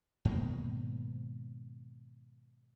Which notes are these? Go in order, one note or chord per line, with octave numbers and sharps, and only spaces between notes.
G#2 B2 D#3 A#3